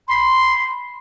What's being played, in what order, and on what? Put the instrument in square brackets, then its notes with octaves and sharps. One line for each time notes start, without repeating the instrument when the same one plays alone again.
[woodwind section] B5 C6